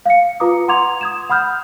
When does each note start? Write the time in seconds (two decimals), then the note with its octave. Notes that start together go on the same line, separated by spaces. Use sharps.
0.06 F5 C#7
0.40 F4 B4 A#5 D6 D#6
0.68 F#5 A#5 C6 D6 G#6 F7
1.01 D#6 G#6 E7
1.30 F#5 B5 D#6 F6 G6